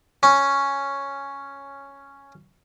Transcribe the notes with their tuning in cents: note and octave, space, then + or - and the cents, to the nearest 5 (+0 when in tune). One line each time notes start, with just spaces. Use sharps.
C#4 +0